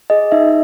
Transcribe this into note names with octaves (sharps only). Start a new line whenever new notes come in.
G#4 D#5
D#4 E5